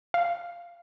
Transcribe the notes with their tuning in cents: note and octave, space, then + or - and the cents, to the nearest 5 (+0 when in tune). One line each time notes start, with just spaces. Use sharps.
F5 -10